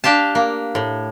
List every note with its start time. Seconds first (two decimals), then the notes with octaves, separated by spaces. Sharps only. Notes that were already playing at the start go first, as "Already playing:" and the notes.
0.04 D4 G4 F5 A5
0.35 A#3
0.75 A2